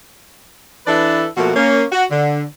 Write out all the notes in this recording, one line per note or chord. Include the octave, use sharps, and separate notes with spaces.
E3 D4 E4 A4 B4 D5
B2 F3 A3 A#3 F#4
A#3 C#4
F#4
D3